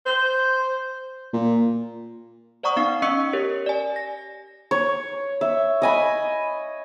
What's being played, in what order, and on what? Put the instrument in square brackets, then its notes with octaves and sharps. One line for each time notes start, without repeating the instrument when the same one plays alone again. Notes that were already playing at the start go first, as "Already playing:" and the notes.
[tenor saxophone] C5
[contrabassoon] A#2
[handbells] C5 D5 F#5 A#5 C#6 D#6
B3 D#4 F5 C7
C#4 D#5 C#6 E6 C#7
G4 A#4 C#5
D5 G#5
A#6
[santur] C#5
E5
D#5 G#5 B5